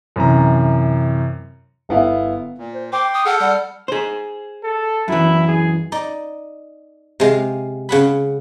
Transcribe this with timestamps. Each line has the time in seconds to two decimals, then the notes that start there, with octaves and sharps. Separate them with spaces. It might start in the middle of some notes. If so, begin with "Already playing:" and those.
0.16 F#2 C3 E3 A#5
1.89 G1 B3 E4 F5
2.58 A#2
2.74 C5
2.93 G5 C6 D6
3.14 D#6
3.25 G#4 A4 F#5 F6 G6
3.40 G3 F#5
3.88 G#4 C5
4.63 A4
5.08 F#2 E3 E4
5.47 G#4
5.92 D#4 D5
7.20 C3 G#3 F5
7.89 C#3 F#5 B5